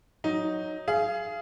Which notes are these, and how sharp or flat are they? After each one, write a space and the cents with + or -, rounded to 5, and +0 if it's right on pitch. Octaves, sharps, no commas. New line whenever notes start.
F#3 +0 D#4 +0
G#4 +15 F5 -30